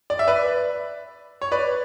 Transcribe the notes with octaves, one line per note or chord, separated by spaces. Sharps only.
D5
E5
B4 D5
C#5
B4 D5